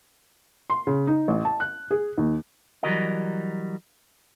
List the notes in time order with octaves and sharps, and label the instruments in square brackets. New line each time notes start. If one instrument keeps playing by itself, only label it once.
[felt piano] C6
C#3
D#4
A1
A5
F#6
G#4
D#2
[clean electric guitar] E3 F#3 G3 F#4 A#4 D#5